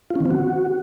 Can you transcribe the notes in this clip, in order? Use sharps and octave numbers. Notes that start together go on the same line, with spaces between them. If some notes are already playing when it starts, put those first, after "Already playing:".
F4
C#4
D#3
C4
F#4